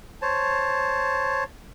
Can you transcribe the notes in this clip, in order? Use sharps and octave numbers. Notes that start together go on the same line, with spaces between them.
C5 C#5 A5